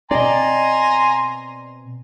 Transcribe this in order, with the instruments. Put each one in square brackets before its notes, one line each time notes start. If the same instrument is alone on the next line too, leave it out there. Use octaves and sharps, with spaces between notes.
[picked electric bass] B2 C4 [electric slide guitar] D5 D#5 [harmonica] G#5 A#5 C6